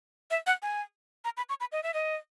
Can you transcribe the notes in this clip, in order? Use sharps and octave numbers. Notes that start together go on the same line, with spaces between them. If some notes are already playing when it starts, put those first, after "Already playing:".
E5
F#5
G#5
A#5
B5
C#6
B5
D#5
E5
D#5